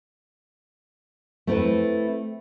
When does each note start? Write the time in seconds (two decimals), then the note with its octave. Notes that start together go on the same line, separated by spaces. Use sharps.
1.47 A3 C4 E4 B4